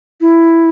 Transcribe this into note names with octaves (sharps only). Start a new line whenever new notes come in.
E4